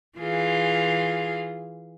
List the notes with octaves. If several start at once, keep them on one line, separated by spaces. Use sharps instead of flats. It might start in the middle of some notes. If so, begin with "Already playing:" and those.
E3 F4 G#4